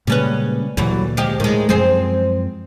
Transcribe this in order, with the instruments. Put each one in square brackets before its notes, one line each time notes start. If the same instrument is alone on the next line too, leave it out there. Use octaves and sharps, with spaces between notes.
[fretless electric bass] A#2 C#3 G#3 [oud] G3 C#4 B4
[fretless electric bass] D2 A#2 [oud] E3 F#3 G3
[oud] F3 G#3 G4
[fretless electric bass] A2 [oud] D#3 G#3
[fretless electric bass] F#2 F3 G#3 [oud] C4 G#4 C5